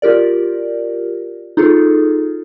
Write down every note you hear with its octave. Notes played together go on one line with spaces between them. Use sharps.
F4 G4 A#4 D5
D#4 F4 G#4 A4